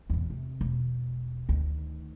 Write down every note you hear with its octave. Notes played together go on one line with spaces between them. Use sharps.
E2 A#2
C3
E1
D2 D#3